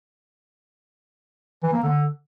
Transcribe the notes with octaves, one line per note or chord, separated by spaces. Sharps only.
E3
A#3
D3